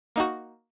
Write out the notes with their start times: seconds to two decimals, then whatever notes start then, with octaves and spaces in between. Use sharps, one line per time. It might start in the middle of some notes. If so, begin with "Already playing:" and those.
0.16 A#3 D#4 F#4